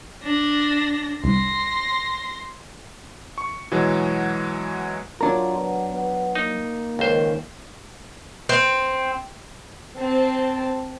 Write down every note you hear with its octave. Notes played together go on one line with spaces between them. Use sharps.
D4 A#6
C2 C6 A#6
C#6
B2 E3 F#3 G#3
F#3 D4 F4 A#4
B3
B3
A#3 D#4
C#2 D#3 C5
C4
C4 A5